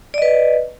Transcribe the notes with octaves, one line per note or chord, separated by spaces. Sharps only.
B4 D5 D#5